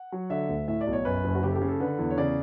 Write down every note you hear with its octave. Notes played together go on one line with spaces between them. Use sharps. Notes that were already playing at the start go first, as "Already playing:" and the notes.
Already playing: F#5
F#3
D3 E5
D2
A2 E5
D5
B1
C#5
F#2 B4
F#1
F#4
C#3 G4
A4
G4
C#3
A4
D3 B4
E2
C#5
C#3 D5